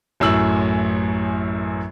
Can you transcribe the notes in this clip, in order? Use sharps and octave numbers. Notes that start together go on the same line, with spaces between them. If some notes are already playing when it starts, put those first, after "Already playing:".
A1 F#2 A2 E6 F#7